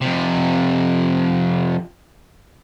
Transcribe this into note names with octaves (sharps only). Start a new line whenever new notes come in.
F2 C3